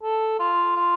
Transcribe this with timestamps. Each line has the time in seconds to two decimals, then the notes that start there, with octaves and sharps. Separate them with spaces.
0.03 A4
0.40 F4
0.76 F4